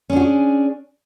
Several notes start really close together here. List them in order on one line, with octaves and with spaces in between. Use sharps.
C#4 D4 F#4 G#4